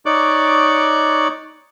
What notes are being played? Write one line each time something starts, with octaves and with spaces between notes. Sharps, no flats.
D#4 C#5 D5 C#6 D6 F#6